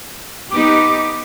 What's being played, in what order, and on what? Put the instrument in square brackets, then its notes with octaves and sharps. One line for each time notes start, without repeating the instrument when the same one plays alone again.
[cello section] B3 D#4 G4 [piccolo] D6